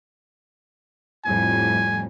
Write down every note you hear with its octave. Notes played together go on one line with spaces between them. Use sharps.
F2 A2 G3 G#5